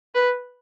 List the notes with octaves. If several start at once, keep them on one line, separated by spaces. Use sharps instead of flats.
B4